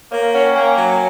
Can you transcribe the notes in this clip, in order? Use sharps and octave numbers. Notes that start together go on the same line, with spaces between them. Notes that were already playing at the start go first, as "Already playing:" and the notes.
A#3 C#5
F5
C#4 F#5
G5
A#3 G#5
F#3 A#5
G#5